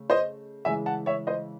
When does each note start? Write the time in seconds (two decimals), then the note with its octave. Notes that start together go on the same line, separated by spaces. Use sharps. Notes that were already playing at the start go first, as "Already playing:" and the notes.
Already playing: C#3 A3
0.10 C5 D#5
0.65 C#3 E3 G#3 E5 G#5
0.86 F#5 A5
1.06 C#5 E5
1.27 C5 D#5